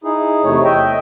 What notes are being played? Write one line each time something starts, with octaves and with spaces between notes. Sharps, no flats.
D#4 E4 G#4
E2 C3 A3 C#5
D#5 E5 G5